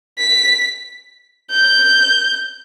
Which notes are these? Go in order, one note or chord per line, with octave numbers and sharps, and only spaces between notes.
B6
G6